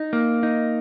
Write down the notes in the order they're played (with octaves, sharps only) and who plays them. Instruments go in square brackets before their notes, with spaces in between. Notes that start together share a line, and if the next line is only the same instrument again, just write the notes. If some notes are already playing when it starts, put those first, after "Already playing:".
Already playing: [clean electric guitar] D#4
A#3
D#4